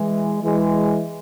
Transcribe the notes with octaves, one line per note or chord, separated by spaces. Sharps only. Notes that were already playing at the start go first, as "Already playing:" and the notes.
Already playing: E3 G#3
E3 G#3